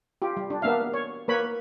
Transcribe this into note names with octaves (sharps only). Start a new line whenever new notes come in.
F4 G4
G3
D4
A#3 B3 D4 E5 F5
C#5
A#3 B4 C#5 B5